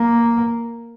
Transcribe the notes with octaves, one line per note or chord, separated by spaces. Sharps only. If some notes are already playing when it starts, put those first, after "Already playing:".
Already playing: A#3